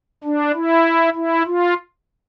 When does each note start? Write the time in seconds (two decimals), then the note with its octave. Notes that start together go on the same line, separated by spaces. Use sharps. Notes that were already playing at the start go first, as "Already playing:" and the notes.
0.24 D4
0.54 E4
1.15 E4
1.46 F4